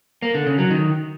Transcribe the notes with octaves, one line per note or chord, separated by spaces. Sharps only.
A#3
D3
C#3
F#3
D#3